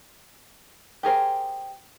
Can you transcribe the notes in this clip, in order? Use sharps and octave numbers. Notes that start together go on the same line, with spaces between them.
G4 G#4 A#4 C5